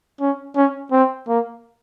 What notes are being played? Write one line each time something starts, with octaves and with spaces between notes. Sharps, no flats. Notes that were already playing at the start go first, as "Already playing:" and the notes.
C#4
C#4
C4
A#3